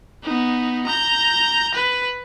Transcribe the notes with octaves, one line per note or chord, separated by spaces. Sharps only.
B3 D#4
A#5 G6
B4